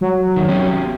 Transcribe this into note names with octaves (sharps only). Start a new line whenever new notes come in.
F#3
F2 D#3
B3 C#4 G4